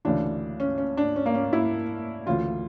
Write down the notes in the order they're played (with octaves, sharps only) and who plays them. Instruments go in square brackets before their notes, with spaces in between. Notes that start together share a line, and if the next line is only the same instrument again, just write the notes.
[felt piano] D2 C#3 E3 D4
C#4
C#4
D4
C#4
A#3
C#4
E4
D2 C#3 E3 F4